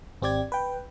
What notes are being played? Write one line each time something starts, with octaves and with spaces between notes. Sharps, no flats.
G#1 C4 G4 D5 G#6
B4 G5